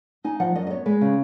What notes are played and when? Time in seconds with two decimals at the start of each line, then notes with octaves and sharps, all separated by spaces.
0.24 D#4 G#5
0.40 F3 F#5
0.55 F#2 D#5
0.67 D#5
0.71 B3 C#5
0.86 G#3 B4
1.01 C#3